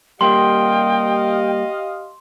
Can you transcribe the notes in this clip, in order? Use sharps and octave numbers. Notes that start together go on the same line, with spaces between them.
G3 A#3 G4 D#5 F5 G5 C6